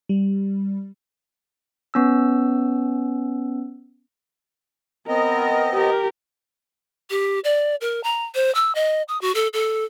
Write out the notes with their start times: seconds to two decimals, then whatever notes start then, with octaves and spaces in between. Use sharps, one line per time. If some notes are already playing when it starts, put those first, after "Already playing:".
0.09 G3
1.94 B3 C#4 E6
5.08 B3 C4 A#4 D#5
5.73 G4 A#4
7.10 G4
7.44 D5
7.81 A#4
8.04 A#5
8.35 C5
8.55 E6
8.75 D#5
9.08 D#6
9.21 F#4
9.35 A4
9.53 A4